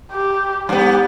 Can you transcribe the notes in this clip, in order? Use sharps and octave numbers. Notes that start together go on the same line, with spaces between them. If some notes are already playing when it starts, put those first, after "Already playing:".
G4
G2 B3 G4